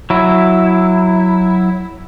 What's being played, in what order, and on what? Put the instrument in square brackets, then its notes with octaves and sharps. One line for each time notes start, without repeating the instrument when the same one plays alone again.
[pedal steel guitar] F#3 E4